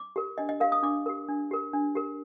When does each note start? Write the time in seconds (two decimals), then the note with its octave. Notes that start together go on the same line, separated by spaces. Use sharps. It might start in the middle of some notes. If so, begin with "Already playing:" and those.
Already playing: D6
0.16 G4 A#4
0.38 D4 D#5
0.49 D#5
0.60 G4 A#4 F5
0.72 D#6
0.83 D4 D6
1.06 G4 A#4
1.28 D4
1.51 G4 A#4
1.73 D4
1.95 G4 A#4